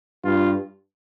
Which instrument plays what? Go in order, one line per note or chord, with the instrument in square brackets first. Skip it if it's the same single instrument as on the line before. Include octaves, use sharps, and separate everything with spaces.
[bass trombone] G2 [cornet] F4